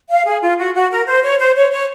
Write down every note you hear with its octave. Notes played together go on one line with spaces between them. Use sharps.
F5
G#4
F4
F#4
F#4
A#4
C5
C#5
C5
C#5
C#5